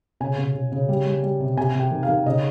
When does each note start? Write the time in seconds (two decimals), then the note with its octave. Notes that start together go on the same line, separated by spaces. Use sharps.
0.20 C#3 G#5
0.38 C#3
0.55 C#3
0.72 C#3
0.89 G3
1.06 G3
1.23 G3
1.40 C3
1.57 C3 G#5
1.74 C3
1.80 G5
1.91 D#3
2.03 F5
2.09 D#3
2.26 C#3 D#5